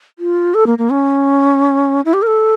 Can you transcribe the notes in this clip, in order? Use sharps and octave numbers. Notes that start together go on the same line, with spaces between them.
F4
A4
A#3
A#3
C#4
E4
G4
A#4
A4